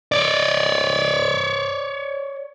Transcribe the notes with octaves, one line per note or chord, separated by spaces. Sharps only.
C#5 D5